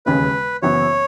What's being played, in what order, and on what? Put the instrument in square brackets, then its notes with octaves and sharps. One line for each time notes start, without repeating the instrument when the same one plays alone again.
[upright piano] E1 D#2 C#3 G#3 [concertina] B4
[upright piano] F#1 F#2 E3 B3 [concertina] C#5